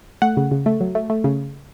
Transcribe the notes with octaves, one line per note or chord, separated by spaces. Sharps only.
A3 F#5
C#3
C#3
A3
F#3
A3
A3
C#3